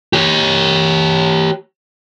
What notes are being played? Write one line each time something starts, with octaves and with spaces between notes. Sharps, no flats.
G4 C#5